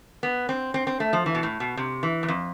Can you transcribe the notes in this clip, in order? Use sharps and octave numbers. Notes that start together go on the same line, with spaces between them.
B3
C4
C4
C4
A3
F3
E3
B2
A2
B2
C3
E3
E2
F2